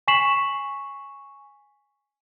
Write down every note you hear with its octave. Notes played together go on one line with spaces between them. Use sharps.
G#5 C#6 B6 C7 E7 F#7